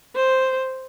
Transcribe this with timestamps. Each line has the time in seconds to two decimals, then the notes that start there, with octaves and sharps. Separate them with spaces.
0.15 C5